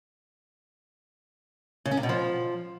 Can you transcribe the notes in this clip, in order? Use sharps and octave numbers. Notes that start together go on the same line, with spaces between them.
C#3
C#4
C3
B2
F3